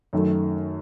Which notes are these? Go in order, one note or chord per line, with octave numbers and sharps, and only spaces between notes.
F#2 D#3 A3